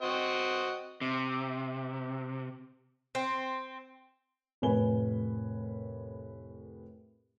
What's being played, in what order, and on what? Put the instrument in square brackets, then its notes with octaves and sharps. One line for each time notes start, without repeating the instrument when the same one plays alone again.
[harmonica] C4 F#4 D#5
[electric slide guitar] C3
[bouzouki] C4
[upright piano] F1 A2 A#4 B4 G#5 G7